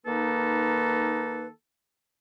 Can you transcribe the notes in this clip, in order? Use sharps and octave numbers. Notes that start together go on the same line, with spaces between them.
D#3 A#3 D#4 A4 B4